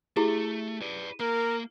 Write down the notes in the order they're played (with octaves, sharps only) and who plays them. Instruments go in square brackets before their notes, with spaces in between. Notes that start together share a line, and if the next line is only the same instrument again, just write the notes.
[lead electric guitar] A3 [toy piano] E4 G4 G#4
[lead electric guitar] B4 D5
[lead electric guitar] A#3 [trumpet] A#4